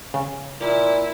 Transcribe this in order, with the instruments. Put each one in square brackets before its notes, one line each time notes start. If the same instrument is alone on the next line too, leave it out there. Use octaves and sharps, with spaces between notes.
[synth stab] C#3
[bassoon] A#2 [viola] E4